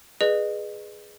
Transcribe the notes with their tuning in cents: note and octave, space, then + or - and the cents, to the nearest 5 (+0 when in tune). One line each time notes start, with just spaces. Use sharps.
G#4 +0 B4 -5 D#5 -35